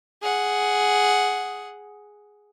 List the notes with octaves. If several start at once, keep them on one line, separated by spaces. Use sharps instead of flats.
G#4 F#5